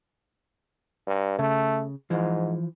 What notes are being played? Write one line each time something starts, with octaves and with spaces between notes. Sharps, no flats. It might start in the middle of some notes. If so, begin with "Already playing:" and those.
G2
C#3 A3
G#2 E3 F3